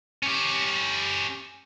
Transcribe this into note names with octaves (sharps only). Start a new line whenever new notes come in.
C#4 G4